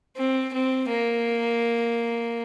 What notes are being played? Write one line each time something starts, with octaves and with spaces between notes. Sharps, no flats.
C4
C4
A#3